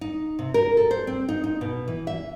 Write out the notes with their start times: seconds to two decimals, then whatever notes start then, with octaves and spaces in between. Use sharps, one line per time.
0.01 D#4
0.39 C3
0.54 A#4
0.77 A4
0.91 C5
1.07 C4
1.29 D#4
1.44 D#4
1.61 B2
1.88 E3
2.07 E5